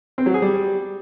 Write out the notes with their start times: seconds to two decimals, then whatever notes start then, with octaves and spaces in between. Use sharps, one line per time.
0.18 C4
0.26 F#3
0.34 G#4
0.42 G3